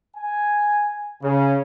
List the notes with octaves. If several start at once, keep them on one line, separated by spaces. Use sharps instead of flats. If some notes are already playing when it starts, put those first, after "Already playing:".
G#5
C#3